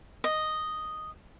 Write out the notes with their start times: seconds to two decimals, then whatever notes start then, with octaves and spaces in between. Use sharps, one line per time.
0.24 D#5